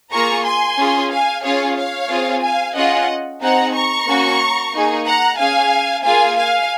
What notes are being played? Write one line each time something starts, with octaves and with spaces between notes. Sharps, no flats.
A#3 F4 G#4 A#5 C#6
G#5 C6
C#4 F4 G#4
F5 G#5
C#4 F4 G#4 C#5 F5
C#5 F5
C4 F4 G#4
F5 G#5
C#4 F4 G#4 D#5 F#5
C4 D#4 G#4 F#5 A#5
A#5 C#6
A#3 C#4 F#4
A#3 D#4 G#4
F#5 A#5
C#4 G#4 F5 G#5
A#3 F4 G#4 F5 G#5
F5 G#5